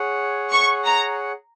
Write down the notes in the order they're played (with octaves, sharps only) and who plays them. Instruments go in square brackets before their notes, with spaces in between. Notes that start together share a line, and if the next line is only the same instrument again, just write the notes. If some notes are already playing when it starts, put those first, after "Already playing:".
Already playing: [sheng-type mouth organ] G#4 C#5 F#5
[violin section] C#6
A#5